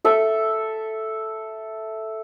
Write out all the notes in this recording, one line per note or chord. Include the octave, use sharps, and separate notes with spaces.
A4 E5